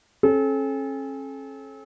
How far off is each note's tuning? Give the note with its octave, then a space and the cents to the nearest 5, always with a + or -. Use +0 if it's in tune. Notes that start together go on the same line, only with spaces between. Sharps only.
C#4 -40 A4 -35